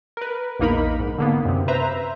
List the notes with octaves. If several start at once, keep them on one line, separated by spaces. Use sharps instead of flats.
A#4 B4
A#1 E2 A#3 D#4 A#4 B5
G#2
D3 A#3 B3
F#2 C3
B4 C5 E5 A#5